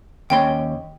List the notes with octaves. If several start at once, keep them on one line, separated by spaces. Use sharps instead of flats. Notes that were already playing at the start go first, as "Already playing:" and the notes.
D#2 C#4 G5 C6